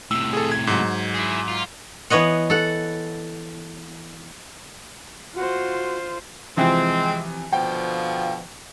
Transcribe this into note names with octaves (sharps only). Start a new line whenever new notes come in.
A2 C3 E6
G#4 A4
G#6
G#2 F#3
E4 G#4
F4
E3 B3 C#5 D#5 F#5
A4 F#5
F4 F#4 C5
C3 E3 F3 G#3 C4
B2 D3 F3 G5